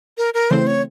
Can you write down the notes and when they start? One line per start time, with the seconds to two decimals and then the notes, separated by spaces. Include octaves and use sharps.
0.18 A#4
0.34 A#4
0.51 C#3 E3 A3 C4 C5
0.67 C#5